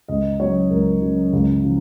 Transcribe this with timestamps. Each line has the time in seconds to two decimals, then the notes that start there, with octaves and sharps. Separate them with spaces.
0.08 C#2 D#5
0.40 C#3 F#3 C#5
0.71 C#2 A#4
1.02 C#3 F#3
1.33 C#2
1.64 C#3 F3